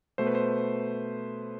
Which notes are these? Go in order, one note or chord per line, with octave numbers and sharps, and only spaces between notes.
B2 A3 C5
B4
C5